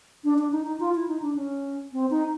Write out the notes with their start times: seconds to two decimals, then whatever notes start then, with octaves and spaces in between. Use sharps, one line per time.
0.24 D4
0.38 D4
0.52 D#4
0.67 D#4
0.80 F4
0.95 E4
1.08 D#4
1.22 D4
1.36 C#4
1.93 C4
2.10 D#4